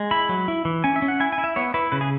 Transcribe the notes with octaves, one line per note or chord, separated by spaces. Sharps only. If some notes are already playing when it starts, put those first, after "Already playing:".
Already playing: G#3
E4 B5
F#3
E4
E3
C#4 G#5
E5
C#4
F#5
E4 G#5
G#5
E4
E5
B3 C#5
E4 B4
C#3 B4
G#4